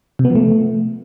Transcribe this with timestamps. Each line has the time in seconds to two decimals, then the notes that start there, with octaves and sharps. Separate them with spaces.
0.19 C3
0.25 B3
0.30 F3
0.35 A3